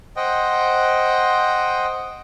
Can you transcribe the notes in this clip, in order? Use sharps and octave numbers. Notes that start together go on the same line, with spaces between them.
C5 D#5 F#5 G5